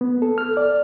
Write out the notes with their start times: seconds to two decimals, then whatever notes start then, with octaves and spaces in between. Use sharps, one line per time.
0.01 B3
0.22 A4
0.38 F6
0.57 D5